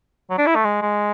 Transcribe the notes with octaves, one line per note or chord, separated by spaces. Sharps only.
F#3
D4
E4
A3
G#3
G#3